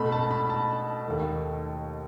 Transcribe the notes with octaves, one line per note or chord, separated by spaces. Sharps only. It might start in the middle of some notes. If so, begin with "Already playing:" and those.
Already playing: B2 A3 B5
A5
B5
A5
D#2 D#3 A3